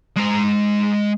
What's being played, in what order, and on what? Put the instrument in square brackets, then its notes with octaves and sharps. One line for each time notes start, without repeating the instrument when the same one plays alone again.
[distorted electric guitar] G#3 A#5